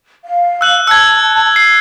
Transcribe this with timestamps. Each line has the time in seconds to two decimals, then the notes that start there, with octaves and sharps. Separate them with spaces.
0.23 F5
0.61 E6 F#6 F#7
0.87 A5 E6 F#6 G#6
1.56 C7